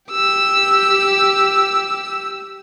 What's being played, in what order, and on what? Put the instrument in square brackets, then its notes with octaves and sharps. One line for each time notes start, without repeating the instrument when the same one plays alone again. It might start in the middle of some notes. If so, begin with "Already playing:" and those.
[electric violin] G4 E6